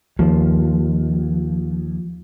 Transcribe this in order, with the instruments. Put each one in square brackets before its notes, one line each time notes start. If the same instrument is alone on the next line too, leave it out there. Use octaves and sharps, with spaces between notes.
[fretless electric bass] D#2 [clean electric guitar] F3